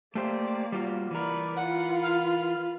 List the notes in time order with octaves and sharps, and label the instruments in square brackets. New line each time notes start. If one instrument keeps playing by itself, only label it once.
[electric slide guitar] A3 G4 C5 [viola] A#3 D5
[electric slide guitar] G3 F4 F#4
[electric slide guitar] E3 A#4 [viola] B4 D5
[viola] F4 B4 [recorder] F#5
[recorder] F6